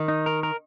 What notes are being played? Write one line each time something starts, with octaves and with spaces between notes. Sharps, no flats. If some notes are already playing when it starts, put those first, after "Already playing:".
Already playing: D#3
D#4
A#4
A#4